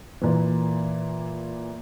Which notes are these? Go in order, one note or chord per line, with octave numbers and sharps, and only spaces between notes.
A#2 E3